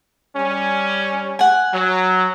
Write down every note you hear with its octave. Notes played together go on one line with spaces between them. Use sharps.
G3 C#4
F#5 G#5
F#3